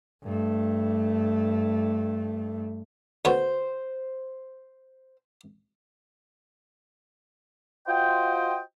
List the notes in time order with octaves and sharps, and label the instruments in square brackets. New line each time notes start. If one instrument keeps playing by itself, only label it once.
[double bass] G2 A3
[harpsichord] D2 B3 C#5 [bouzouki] C5
[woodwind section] F4 F#4 C5 D#5 G5